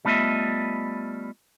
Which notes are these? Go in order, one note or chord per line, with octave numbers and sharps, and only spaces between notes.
G3 A3 B3 F4 D#5 E5